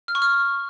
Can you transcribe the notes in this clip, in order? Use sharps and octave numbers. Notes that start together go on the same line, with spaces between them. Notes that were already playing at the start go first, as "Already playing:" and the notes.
F6
C#6
F6